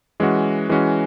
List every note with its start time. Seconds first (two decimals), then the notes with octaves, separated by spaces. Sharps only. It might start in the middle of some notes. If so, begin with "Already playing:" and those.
0.20 E3 G#3 C#4 F#4
0.69 E3 G#3 C#4 F#4